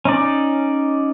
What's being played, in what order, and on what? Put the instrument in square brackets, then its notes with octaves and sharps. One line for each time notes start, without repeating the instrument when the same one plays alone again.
[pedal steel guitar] C#4 D#4 D5